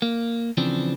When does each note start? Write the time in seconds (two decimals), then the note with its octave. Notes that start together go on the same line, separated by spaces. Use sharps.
0.02 A#3
0.57 C#3 E3 F3 C4 D4